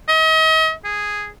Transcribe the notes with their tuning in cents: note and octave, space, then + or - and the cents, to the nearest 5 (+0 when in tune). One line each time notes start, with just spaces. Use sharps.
D#5 +40
G#4 -5